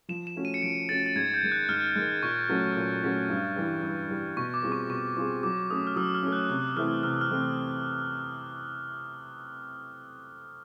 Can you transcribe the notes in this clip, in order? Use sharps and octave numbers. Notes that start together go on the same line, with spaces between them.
F3 E7
E7
A3 C#4 F#4
D#7
C#7
F3 D7
A3 C#4 F#4 A6
A6
G#2 G#6
G6
D#3 G#3
F#6
G#2 F6
D#3 G#3
A#2 C#6
F#3 A3 C#4 F#4
A#2
F#3 A3 C#4 F#4
G2
E3 G3
G2
E3 G3
B2 C#6
D6
G3 C4 F4 G#4
C#6
B2 C#6
G3 C4 F4 G#4
F#3 D6
A3 C#4 D#6
F6
F#3 E6
F6
A3 C#4
F#6
C3 F#6
E3 A3 C4 E4 F6
C3 F6
F6
E3 A3 C4